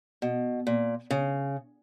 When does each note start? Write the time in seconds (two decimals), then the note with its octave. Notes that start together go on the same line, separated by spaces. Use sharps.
0.22 B2
0.67 A#2
1.11 C#3